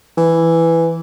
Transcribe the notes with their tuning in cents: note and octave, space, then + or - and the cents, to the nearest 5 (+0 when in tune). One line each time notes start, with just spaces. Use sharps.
E3 +5